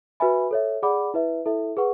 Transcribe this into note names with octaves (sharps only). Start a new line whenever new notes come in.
F#4 B4 E5 G#5 B5
A4 C#5 E5
G#4 D5 F#5 B5 D6
E4 B4 E5
E4 A4 E5
G#4 B4 F#5 C#6